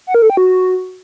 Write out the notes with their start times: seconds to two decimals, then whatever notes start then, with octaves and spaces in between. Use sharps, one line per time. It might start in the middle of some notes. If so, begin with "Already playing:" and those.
0.07 F#5
0.15 A#4
0.22 A4
0.30 G5
0.37 F#4